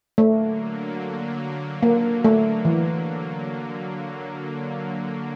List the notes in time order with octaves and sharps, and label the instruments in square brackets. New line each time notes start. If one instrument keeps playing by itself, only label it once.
[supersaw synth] D3 F#3 A#3 [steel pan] A3
[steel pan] A#3
A3
E3